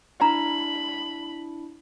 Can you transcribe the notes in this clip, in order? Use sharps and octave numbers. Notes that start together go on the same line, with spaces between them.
D4 E4 A#5 B5